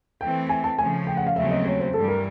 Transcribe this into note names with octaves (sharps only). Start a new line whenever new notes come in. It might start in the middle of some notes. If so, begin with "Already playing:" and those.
E3 A3 C4 G5
G#5
A5
C#3 F3 A3 G#5
G5
F#5
F5
D#2 C#3 F#3 A3 C4 E5
D#5
C#5
C5
G2 E3 G3 A4
A#4